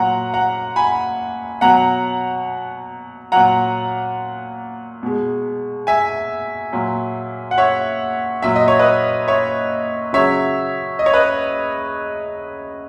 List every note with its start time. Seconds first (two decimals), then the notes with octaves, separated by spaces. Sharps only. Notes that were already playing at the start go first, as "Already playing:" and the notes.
Already playing: A#2 F#3 F#5 A#5
0.34 F#5 A#5
0.76 G#5 B5
1.61 B2 F#3 F#5 A#5
3.32 A#2 F#3 F#5 A#5
5.03 B2 G#3
5.87 E5 G#5
6.72 A#2 F#3
7.51 F#5
7.58 C#5 E5
8.42 A#2 F#3 E5
8.56 D#5
8.68 C#5
8.79 B4 D#5
9.28 C#5 E5
10.13 C#3 F#3 C#5 E5
10.99 D#5
11.06 C#5
11.13 B4 D#5